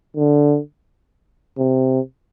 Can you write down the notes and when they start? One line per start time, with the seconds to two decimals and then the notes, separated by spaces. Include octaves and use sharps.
0.17 D3
1.58 C3